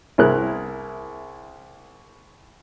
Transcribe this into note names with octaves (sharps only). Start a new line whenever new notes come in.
C2 E4 G#4 A#4 F#6